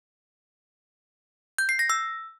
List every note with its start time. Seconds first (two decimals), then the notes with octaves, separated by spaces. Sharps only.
1.58 G6
1.69 C7
1.79 A#6
1.90 E6